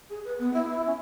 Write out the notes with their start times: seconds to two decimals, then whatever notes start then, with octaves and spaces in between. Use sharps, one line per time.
0.09 G#4
0.24 B4
0.39 B3
0.53 E4
0.69 E4
0.86 C#4